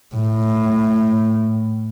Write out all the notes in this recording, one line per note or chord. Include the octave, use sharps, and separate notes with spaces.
A2